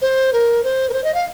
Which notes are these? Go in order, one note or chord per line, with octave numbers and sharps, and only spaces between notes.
C5
A#4
C5
A#4
C5
D#5
F5